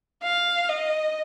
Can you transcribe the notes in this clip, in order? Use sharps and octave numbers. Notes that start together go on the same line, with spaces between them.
F5
D#5